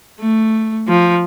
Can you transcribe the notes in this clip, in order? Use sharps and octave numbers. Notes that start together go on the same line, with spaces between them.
A3
F3